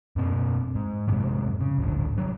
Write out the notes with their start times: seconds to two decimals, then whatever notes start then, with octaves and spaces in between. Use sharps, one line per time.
0.16 F#2 B2 C4
0.75 G#2
1.08 F2 G#2 C3
1.61 C#3
1.78 D1 G#1 D3
2.17 F1 F#3 G3